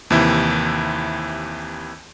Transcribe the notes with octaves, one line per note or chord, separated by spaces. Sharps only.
D#2 C3 E3 E4